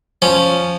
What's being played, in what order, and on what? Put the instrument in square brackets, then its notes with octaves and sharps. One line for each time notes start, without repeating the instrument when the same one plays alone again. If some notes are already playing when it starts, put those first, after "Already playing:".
[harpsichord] F3 C#4